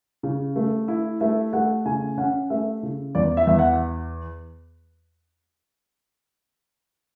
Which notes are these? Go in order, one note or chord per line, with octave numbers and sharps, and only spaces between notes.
C#3
A3
E4
A3 E5
A3 F#5
C#3 G#5
C#4 F#5
A3 E5
C#3
E2 D5
E5
E2 E5
F#5